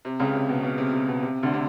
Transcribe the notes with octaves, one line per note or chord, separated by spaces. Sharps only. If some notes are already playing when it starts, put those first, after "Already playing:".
C3
C#2 C#3
C3
B2
B2
C3
C3
B2
C3
D2 D3
C3